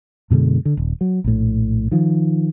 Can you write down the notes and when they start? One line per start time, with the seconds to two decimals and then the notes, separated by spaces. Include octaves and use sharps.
0.30 F#2 B2 D3 G#3
0.65 D3
0.77 D#1
1.01 F#3
1.24 A#1 A2
1.92 D#3 F3